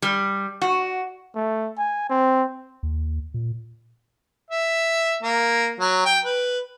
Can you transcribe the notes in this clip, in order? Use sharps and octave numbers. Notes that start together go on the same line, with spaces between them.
G3
F#4
A3
G#5
C4
D#2
A#2
E5
A#3
F#3
G5
B4